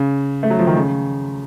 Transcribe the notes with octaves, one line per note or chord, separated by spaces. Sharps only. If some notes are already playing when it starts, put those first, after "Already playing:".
Already playing: C#3
A3
F#3
F3
D#3
C#3